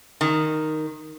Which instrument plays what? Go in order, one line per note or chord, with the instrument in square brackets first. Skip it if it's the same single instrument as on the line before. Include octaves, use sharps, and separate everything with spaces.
[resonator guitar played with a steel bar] D#3